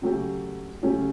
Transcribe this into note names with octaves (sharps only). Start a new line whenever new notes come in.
C#3 F#3 A3 C#4 G4
C#3 F#3 A3 C#4 G4